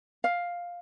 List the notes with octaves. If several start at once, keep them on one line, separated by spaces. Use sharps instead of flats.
F5